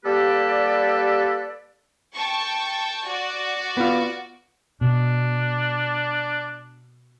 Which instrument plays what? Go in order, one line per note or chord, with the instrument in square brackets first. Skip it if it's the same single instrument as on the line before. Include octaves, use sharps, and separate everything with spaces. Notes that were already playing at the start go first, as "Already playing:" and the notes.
[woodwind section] G3 A#3 G4 A4 B4 D5
[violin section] G5 A5 C#6
F#4 D5
[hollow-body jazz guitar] B3 F4
[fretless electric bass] B2 [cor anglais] D4